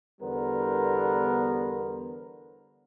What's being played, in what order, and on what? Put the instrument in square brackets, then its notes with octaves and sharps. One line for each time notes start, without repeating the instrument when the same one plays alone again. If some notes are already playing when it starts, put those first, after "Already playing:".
[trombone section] E2 D3 G3 B3 A#4 C5